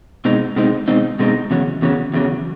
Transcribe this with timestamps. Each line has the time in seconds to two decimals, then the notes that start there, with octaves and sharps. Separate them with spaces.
0.25 B2 G#3 C4 D#4
0.56 B2 G#3 C4 D#4
0.88 B2 G#3 C4 D#4
1.19 B2 G#3 C4 D#4
1.51 E2 C#3 F#3
1.82 E2 C#3 F#3
2.14 E2 C#3 F#3